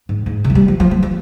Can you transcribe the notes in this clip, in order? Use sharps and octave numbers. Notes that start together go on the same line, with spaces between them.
G#2
G#2
C3
F3
G3
F3
F3
F3
F3